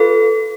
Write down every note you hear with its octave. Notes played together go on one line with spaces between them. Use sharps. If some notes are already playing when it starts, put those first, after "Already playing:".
Already playing: F4 A4 B4